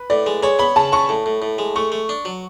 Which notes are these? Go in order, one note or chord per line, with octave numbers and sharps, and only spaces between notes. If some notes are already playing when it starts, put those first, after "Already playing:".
Already playing: B4
A2 D5
G#3
G#3 C#5
B3 B5
C#3 A5
C#3 C#6
A2
A2
A2
G#3
A3 C#6
A3
D4
F#3